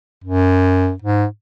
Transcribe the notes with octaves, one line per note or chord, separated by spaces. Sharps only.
F#2
G#2